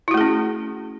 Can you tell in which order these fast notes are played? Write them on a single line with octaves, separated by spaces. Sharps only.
E4 F#4 A3 G#4 C#4